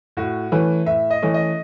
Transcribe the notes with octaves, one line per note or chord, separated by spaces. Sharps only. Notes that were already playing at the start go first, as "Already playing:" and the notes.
A2 F#4
E3 A3 C#4 B4
A2 E5
D#5
E3 A3 C#4
D#5